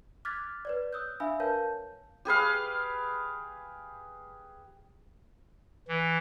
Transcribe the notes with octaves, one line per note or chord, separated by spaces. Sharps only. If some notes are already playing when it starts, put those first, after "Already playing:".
D6 F6 F#6 G#6 A6 B6
B4 C#5 D5
D#6 E6 F#6 G6
D4 E5 F5 G#5 B5 E6
A#4 B4 C#5 F5 A5 G6
G4 G#4 B4 F5
E3